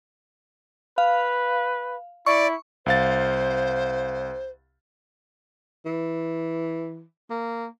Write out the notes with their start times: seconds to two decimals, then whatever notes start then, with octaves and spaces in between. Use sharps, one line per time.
0.98 B4 F5
2.26 E4 D5 C#6
2.86 C2 C5 F5 A6
5.86 E3
7.30 A#3